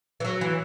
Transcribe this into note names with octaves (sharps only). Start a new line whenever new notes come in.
E3
F#3
E3